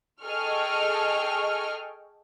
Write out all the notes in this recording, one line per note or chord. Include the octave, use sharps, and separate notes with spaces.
G#4 A4 D#5 G5 C#6 F6